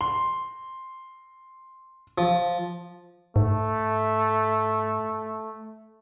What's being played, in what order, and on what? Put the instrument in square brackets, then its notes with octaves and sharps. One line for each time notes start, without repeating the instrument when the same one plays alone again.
[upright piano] C6
[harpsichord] F3
[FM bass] G#2 [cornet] A3